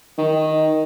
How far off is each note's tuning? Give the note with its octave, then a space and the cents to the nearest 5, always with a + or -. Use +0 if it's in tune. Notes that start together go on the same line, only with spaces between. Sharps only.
D#3 +5